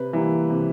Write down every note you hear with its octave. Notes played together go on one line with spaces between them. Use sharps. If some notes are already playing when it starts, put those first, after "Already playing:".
Already playing: C3 B4
E3 G3 A#3
C3